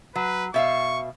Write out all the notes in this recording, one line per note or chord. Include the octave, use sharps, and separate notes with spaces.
F#3 B4
B2 E5 F5 C#6